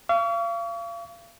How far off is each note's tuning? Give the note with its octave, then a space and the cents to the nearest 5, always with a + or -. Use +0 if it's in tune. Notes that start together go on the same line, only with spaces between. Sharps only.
F5 -35 C#6 +40